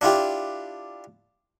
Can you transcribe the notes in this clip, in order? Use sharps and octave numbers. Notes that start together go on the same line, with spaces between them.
D4 E4 F4 G4